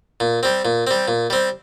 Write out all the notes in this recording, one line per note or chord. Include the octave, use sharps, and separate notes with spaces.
A#2
G3 C4
A#2
G3 C4
A#2
G3 C4